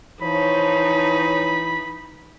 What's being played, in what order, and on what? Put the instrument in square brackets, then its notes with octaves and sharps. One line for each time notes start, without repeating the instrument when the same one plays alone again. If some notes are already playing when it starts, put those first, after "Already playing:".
[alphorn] E3 [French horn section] F3 C5 C#5 [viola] D#4 [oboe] B5